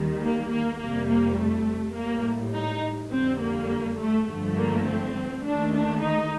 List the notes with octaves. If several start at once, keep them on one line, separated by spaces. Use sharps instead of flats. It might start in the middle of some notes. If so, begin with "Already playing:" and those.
Already playing: D#2 D#3 G3
A#3
A#3
F2 C3 G3 A#3
A#3
A3
A2 G3 A#3
D#4
F2 D3 G3 C4
A#3
A3
G2 D3 F3 A3
A#3
C4
D#2 D#3 A3 D4
D4
D#4